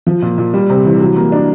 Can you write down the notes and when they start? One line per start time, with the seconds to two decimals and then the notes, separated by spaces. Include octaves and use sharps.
0.07 F3
0.22 A#2
0.38 A#2
0.54 G3
0.70 C3
0.85 E3
1.00 F#3
1.16 A#3
1.32 D4